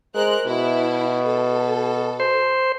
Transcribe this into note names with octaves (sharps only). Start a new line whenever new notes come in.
G#3 A#4 C5 F#6
B2 E4
A4
C5